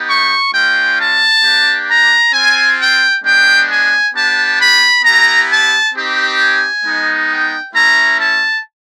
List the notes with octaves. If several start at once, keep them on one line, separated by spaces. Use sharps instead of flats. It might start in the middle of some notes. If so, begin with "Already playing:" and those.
Already playing: B3 D#4 G4
C#6
G#3 C#4 F4 G5
A5
A#3 D4 G4
A#5
C4 F4 G#5
G5
G#3 B3 D4 G5
G#5
B3 D4 G4 A5
B5
B3 E4 G4 A#5
A5
C4 D#4 G4
G#5
G#3 B3 D#4
G5
A3 C#4 E4 A#5
A5